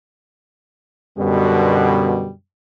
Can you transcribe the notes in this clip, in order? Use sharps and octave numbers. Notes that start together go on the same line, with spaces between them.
F#2 B2 D3 G3